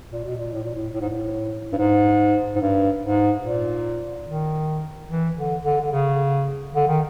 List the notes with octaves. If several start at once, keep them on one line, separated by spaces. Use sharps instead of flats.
A#2
B2
A#2
A2
A#2
A2
A2
G#2
A2
G2
G#2
G#2
G2
G#2
A#2
D#3
E3
D3
D3
D3
C#3
D3
D#3